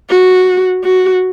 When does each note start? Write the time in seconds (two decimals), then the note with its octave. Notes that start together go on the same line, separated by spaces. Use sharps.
0.10 F#4
0.84 F#4